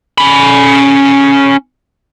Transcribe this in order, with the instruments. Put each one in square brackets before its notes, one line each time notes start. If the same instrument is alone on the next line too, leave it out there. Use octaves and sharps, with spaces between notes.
[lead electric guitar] C#4 B5